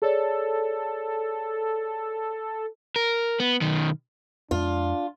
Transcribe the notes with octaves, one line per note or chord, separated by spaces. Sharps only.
G#4 A4 C#5 D5
A#4
B3
B1 D#3
F2 G#3 D4 F4